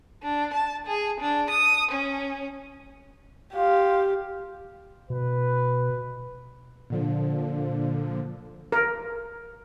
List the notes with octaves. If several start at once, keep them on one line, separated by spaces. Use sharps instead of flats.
D4
A5
G#4
D4
D#6
C#4
F4 G4 F5
B2 B4
A#2 D3 F3
A#4